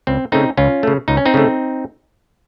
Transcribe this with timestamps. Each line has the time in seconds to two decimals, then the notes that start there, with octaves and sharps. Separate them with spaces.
0.07 C#2 C4
0.32 C#3 A3 C4 D#4
0.57 C#2 C#4 F4
0.83 C#3 A3
1.08 C#2 D#4
1.17 C#4
1.26 C4 D#4
1.34 C#3 A3